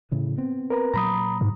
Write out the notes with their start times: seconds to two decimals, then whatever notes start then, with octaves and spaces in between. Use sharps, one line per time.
0.11 A2 C#3 E3
0.38 B3 C4
0.70 A#4 B4 A#5
0.94 A#2 F#3 A#5 B5 D#6
1.41 G#2